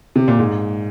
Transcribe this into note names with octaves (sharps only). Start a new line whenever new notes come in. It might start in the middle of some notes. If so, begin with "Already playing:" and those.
C3
A#2
G#2